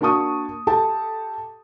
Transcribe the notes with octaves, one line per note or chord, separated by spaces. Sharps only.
A#3 D4 F#4 A5 C#6 D#6
G4 A4 A5